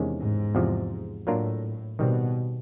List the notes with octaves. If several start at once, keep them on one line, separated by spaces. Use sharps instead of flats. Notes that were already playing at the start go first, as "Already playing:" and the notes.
Already playing: E2 C3 D#3 G#3 C#4
G#2
E2 C3 F3
A2 F#3 A#3 D4 F4 A#4
B2 D#3 G3 C4